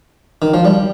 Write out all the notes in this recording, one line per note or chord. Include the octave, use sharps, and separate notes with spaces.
D#3
F3
G3